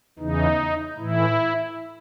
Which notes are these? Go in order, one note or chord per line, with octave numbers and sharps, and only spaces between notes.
E2 C#3 E3 D#4
A2 E3 E4